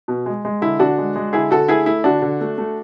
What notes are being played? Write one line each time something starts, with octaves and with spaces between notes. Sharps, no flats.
B2
G#3
G#3
D3 E4
D3 D4 F#4
G#3
G#3
D3 E4 G#4
D3 F#4 A4
A3 E4 G#4
A3 E4
D3 D4 F#4
D3
A3
A3